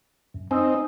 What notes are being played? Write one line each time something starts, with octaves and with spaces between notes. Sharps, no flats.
F#2
C4 D#4 G#5 D#6 E6